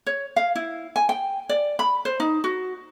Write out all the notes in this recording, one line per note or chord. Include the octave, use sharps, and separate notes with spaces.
C#5
F5
E4
G#5
G5
D5
B5
C5
D#4
F#4